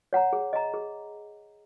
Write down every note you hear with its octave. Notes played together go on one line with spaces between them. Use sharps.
C#5 F#5 A#5
G#4
D#5 A#5
G#4